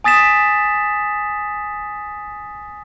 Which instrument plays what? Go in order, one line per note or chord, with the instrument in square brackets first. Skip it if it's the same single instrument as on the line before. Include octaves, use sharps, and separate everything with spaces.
[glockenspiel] G#5 D#6 A6 B6 E7